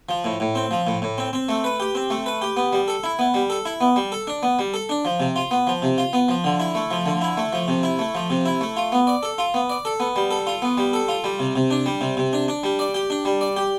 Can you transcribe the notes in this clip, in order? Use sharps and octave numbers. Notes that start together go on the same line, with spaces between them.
F3
A2
A2
C4
F3
A2
A2
C4
C4
A3
B4
G4
C4
A3
B4
G4
B3
G3
A4
E4
B3
G3
A4
E4
B3
G3
A4
D4
B3
G3
A4
D4
F3
C3
F4
B3
F3
C3
F4
B3
F3
D3
E4
A3
F3
D3
E4
A3
F3
C3
E4
A3
F3
C3
E4
A3
F4
B3
D5
A4
F4
B3
D5
A4
B3
G3
A4
F4
B3
G3
A4
F4
G3
C3
C3
D4
G3
C3
C3
D4
D4
G3
D5
G4
D4
G3
D5
G4